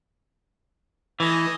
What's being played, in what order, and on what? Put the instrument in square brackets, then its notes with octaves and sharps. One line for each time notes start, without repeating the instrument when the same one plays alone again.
[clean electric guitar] E3 [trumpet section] A3 D#5 G#5